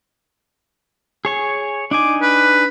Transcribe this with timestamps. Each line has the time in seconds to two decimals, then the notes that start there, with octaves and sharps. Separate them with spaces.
1.25 G#4 C#5 G#5
1.91 D4 D#4 G#5 D6
2.22 B4